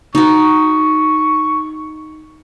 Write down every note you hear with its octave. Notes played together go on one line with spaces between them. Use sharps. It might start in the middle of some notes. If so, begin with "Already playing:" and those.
D#4 F#4 C#6